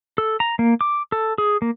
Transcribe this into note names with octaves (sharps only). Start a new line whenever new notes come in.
A4
A#5
A#3
D6
A4
G#4
A#3